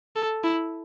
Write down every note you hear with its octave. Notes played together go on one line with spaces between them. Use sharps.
A4
E4